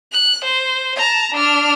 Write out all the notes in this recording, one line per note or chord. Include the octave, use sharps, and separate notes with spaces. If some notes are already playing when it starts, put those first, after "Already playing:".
F#6
C5
A5 A#5
D4 F6